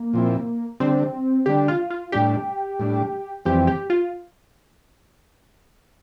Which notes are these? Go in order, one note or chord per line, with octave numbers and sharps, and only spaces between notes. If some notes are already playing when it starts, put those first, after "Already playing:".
Already playing: A#3
A#2 F3 C4 E4
D3 G3 C4 D4
D3 G3 D4 G4
F4
F4
A2 G3 D4 G4
A2 G3 D4
F2 E3 G3 C4 G4
G4
F4